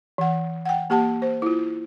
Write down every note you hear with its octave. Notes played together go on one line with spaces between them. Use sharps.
E3 F#5
F#5 G5
A#3 G4 F#5 A5
C5
E4 F4